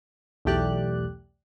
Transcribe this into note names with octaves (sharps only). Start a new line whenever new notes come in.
B1 E2 A3 G4 D5 F#6